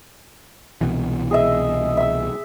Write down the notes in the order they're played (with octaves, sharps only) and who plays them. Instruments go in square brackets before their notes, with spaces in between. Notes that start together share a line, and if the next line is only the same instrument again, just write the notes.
[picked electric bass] C2 B2 E3
[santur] G#4 D#5 E5
E5 E6